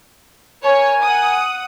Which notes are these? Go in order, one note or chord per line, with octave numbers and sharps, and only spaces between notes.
A#4 C#5 G#5
F#5 D#6